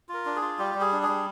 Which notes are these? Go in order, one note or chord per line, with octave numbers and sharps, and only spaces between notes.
F4 A#4
D4
G#4
F4
G3 G4
G3
G#4
D4
G#4
G3